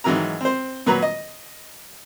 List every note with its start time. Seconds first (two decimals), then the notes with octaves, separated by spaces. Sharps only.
0.04 G#2 D#3 E3 F#3 A#4 A#5
0.41 C4 C5
0.86 A#2 F#3 B4 A#5
1.02 D#5